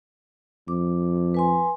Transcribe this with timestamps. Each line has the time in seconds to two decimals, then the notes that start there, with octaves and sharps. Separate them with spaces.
0.68 F2 D6
1.34 B4 G#5 C6